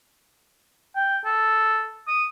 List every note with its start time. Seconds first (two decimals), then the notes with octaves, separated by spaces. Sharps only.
0.96 G5
1.25 A4
2.08 D#6